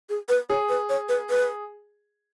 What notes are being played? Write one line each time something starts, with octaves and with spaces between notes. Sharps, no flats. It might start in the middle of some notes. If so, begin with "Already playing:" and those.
G#4
B4
G#4 C#5
B4
C#5
B4
B4